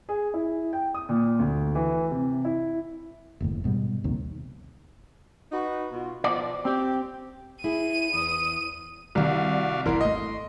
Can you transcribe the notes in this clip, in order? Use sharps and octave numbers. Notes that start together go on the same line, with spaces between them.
G#4
E4
G5
D#6
A#2
D2
E3
C3
E4
F#1 D#2 A2
G#2 B2 E3 G3
A#1 D#2 C3 D#3
D#4 F#4 B4
B2 F4
B2 F3 D5
C4 G4
E4 G#4 D#7
E2 D#6
C2 D#3 G3 F#4 D5 F5
E1 B1 E2 E4 A#4 C6
G#1 A3 D#5